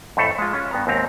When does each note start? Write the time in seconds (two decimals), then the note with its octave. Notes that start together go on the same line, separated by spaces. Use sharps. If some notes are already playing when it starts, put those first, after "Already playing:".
0.17 F2 A2 A3 A4
0.38 G#3 F4
0.53 C#4 F4
0.71 G2 B3 A#5
0.87 D#2 G#2 C4 A#5